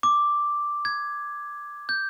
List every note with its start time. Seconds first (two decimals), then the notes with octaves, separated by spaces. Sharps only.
0.03 D6
0.85 G#6
1.89 G6